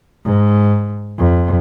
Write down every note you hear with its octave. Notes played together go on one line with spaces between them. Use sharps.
G#2
F2